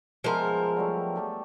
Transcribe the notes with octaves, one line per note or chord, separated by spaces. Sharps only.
F3 G#3 B3 A#4 E5
F#3 G3 A3
A3 G4 A4